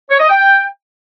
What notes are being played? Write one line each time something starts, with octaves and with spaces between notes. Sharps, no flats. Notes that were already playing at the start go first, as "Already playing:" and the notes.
C#5
D#5
G5